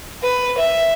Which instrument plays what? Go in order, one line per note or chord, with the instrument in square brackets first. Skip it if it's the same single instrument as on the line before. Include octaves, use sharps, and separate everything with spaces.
[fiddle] B4
E5